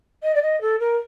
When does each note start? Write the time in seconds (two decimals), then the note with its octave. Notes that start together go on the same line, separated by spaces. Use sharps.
0.23 D#5
0.35 D5
0.42 D#5
0.61 A4
0.79 A#4